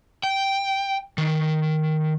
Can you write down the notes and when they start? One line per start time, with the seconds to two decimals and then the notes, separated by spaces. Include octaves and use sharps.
0.23 G5
1.18 D#3